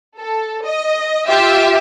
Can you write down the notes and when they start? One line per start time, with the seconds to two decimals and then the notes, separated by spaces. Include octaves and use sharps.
0.19 A4
0.64 D#5
1.27 F4 G4 E5